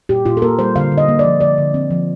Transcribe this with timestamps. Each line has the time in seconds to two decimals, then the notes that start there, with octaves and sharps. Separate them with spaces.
0.09 A#2 G4
0.25 A#2 F4
0.37 A4
0.42 A#3 A#4
0.59 G3 C5
0.76 D3 F5
0.92 D3
0.98 D#5
1.08 A#3
1.19 D5
1.25 F3
1.41 D3 D5
1.58 D3
1.74 C4
1.91 F3